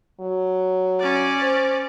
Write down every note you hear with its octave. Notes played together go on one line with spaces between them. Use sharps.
F#3
C#4 D5
C5